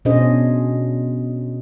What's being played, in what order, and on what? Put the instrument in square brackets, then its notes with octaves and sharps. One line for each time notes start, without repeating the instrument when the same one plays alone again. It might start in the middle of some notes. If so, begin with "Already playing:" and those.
[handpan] B2 C#4 D4 G#4 C5 D#5